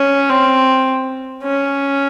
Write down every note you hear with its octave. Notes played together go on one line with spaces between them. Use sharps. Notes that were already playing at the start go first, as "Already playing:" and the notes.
Already playing: C#4
C4
C#4